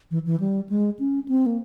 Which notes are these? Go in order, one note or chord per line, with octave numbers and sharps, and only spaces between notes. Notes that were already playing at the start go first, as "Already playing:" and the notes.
E3
E3
G3
G#3
C#4
C4
A#3